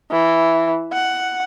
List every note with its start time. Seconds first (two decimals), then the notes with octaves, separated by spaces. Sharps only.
0.12 E3
0.93 F#5